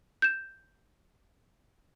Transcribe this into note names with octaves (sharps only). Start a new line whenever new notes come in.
G6 E7